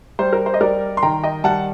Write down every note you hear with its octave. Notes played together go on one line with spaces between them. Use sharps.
G3 C5
A#4
C5
D#5
G3 A#4 D5
C6
D#3 G5 A#5
D#5 G5
G3 F#5 A5